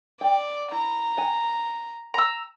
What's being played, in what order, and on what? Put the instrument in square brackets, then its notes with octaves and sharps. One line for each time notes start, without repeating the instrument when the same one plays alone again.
[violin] D5 [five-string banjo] G5
[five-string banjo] E4 [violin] A#5
[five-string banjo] F#5 G#5
[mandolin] A#5 E6